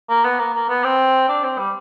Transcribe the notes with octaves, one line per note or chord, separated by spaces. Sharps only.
A#3
B3
A#3
A#3
B3
C4
D4
C4
G3